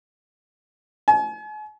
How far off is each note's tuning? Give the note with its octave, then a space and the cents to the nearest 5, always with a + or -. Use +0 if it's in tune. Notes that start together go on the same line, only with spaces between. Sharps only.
G#5 +45